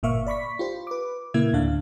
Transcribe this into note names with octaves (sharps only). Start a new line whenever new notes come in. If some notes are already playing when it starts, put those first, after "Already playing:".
G1 A#2 A#3 E5 F5 C#6
D5 B5 C#6 B6
F4 G4 C5
B4 D6
A#2 C#3 A#3 E4 E5 G#6
D2 A2 D3 D4 F5